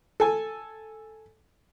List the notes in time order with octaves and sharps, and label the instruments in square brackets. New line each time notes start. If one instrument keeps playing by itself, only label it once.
[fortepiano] A4 G#5